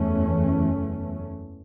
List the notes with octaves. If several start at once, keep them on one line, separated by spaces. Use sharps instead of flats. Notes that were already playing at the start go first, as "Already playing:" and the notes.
Already playing: F#1 E2 E3 A3 C#4